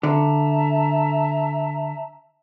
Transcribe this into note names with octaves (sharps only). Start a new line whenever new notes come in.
D3 E5 A5 A#5